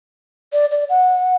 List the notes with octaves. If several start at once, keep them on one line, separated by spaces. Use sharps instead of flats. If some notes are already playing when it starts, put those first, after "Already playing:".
D5
D5
F#5